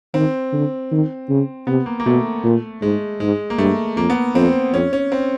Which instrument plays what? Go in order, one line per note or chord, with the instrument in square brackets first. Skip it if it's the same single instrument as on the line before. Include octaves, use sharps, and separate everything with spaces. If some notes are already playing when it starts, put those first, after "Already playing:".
[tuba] D#3 [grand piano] C4
[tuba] D3
D#3
C#3
[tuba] C3 [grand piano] B3
[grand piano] A#3
A#3
[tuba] B2 [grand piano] A3
[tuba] A#2
[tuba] G#2 [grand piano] G#3
[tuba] G#2 [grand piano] G#3
[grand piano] A#3
[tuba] G2 [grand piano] A3
[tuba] F2 [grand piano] A#3
[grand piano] B3
[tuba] F2 [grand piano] C4
[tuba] F2 [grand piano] C#4
[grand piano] C#4
C4